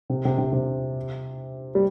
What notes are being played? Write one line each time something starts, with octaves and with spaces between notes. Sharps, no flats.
C3
C3
C3
C3
G3